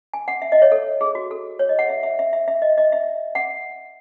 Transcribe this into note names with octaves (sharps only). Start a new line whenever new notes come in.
G#5
F#5
E5
D#5
C#5
A4
G#4
F#4
A4
C#5
D#5
F#5
E5
E5
E5
E5
E5
D#5
D#5
E5
F#5